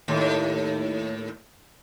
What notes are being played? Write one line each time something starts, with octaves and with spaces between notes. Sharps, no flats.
D#2 A2